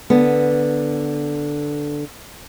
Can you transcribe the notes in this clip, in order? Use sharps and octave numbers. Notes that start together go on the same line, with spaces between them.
D3 B3